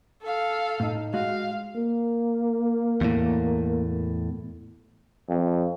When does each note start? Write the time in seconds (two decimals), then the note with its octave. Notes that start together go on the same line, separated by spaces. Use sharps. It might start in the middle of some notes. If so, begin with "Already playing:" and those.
0.22 A4 F5
0.80 A2 D#4
1.14 G#3 F#4 D#5 F5
1.76 A#3
3.01 E2 A2
5.29 F2